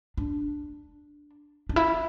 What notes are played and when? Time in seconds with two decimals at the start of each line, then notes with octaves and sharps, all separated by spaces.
0.17 D4
1.69 D4
1.76 E4